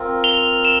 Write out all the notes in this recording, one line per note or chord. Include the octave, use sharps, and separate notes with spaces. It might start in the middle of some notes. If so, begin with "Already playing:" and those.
Already playing: C4 F4 A#4
F7 G7
E7